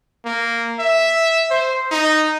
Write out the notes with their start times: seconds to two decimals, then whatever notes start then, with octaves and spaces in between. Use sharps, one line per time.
0.25 A#3
0.80 E5
1.51 C5
1.92 D#4